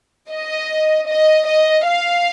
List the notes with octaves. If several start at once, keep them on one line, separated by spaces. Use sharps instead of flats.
D#5
D#5
D#5
F5